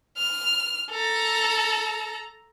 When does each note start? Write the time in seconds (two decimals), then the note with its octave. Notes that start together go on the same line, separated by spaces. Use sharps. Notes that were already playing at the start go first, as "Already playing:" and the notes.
0.18 F6
0.91 A4 A#5